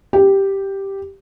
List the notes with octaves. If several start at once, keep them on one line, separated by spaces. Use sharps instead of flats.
G4